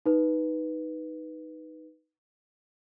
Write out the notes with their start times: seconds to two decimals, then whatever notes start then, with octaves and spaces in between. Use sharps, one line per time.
0.06 D#4 B4